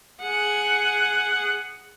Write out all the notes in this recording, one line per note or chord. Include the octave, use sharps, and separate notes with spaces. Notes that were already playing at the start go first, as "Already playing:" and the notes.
G#4 F#5